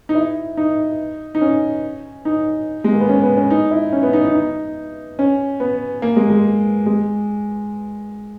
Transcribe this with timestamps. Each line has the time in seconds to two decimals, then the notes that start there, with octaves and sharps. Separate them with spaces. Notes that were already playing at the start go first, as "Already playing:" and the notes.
0.09 D#4
0.15 E4
0.57 D#4
1.35 D#4
1.41 C#4
2.25 D#4
2.84 G#3
2.93 A#3
3.00 B3
3.09 C#4
3.23 B3
3.37 C#4
3.50 D#4
3.71 E4
3.92 C#4
4.03 B3
4.13 D#4
4.25 D#4
4.35 D#4
5.19 C#4
5.60 B3
6.02 A#3
6.16 G#3
6.30 G#3
6.86 G#3